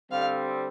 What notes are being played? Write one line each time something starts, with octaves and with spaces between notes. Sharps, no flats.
D3 G3 C4 F5